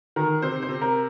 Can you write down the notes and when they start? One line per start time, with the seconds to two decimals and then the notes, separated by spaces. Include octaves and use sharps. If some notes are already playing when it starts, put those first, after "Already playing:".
0.16 D#3 A#4
0.42 C3 C5
0.62 C5
0.69 C3
0.82 A#4